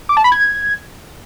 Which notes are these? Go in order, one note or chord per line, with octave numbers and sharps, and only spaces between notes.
D6
A5
B5
G#6